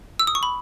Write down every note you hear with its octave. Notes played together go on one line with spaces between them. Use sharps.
E6
D#6
C#6
B5